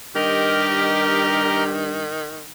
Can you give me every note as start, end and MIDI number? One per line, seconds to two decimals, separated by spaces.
0.15 2.10 43
0.15 2.51 51
0.15 1.77 67
0.15 1.64 70
0.15 1.64 75
0.15 1.64 82